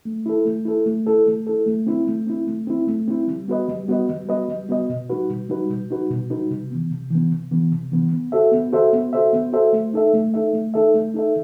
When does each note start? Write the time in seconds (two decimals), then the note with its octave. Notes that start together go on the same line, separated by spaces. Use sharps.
0.05 A3
0.26 E4 A4
0.45 A3
0.65 E4 A4
0.86 A3
1.06 E4 A4
1.26 A3
1.47 E4 A4
1.66 A3
1.87 C4 E4
2.07 A3
2.27 C4 E4
2.47 A3
2.67 C4 E4
2.87 A3
3.08 C4 E4
3.28 G3
3.48 B3 F#4 B4 D#5
3.68 G3
3.88 B3 F#4 B4 D#5
4.09 G3
4.29 B3 F#4 B4 D#5
4.49 G3
4.69 B3 F#4 B4 D#5
4.89 B2
5.10 G3 D#4 F#4 B4
5.30 B2
5.49 G3 D#4 F#4 B4
5.70 B2
5.90 G3 D#4 F#4 B4
6.11 B2
6.30 G3 D#4 F#4 B4
6.51 C3
6.71 E3 B3
6.91 C3
7.11 E3 B3
7.31 C3
7.51 E3 B3
7.72 C3
7.92 E3 B3
8.12 B3
8.32 F#4 A4 C5 E5
8.52 B3
8.73 F#4 A4 C5 E5
8.93 B3
9.13 F#4 A4 C5 E5
9.33 B3
9.53 F#4 A4 C5 E5
9.73 A3
9.93 D#4 A4 E5
10.13 A3
10.34 D#4 A4 E5
10.53 A3
10.74 D#4 A4 E5
10.94 A3
11.14 D#4 A4 E5